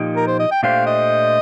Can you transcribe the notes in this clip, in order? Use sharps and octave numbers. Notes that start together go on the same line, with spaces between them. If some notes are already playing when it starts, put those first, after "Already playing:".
Already playing: A#2 F3 A#3 D#4 G4
A#4
C5
D#5
G5
A#2 A3 D4 G4 C5 F5
D#5